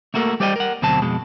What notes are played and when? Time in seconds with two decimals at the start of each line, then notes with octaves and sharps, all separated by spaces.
0.14 A3 A#3 F#4 A4 A#4
0.40 G3 G4 C5 D5 D#5 G5
0.56 A#4 F#5
0.82 D2 B2 F#3 C4 A5
1.02 F2 B2 G#3